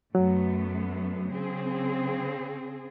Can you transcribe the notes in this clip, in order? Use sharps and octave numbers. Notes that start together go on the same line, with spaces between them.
F#2 F#3 A3 B3
C#3 C4 G#4